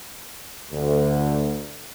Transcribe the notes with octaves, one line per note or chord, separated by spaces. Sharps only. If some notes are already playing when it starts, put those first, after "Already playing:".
D2